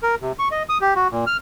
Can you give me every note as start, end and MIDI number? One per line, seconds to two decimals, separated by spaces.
0.03 0.15 70
0.22 0.32 48
0.39 0.48 85
0.51 0.63 75
0.69 0.78 87
0.81 0.94 67
0.96 1.08 66
1.11 1.25 46
1.27 1.37 89